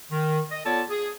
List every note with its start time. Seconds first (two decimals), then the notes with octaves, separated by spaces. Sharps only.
0.11 D#3
0.51 D#5
0.65 B3 F4 A4 C#5 D5 A5
0.90 G#4